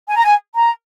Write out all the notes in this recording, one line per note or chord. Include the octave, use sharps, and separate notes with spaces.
G#5
A#5
G#5
A#5